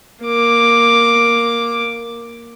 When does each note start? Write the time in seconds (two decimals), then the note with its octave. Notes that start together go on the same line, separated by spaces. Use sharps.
0.25 A#3 D6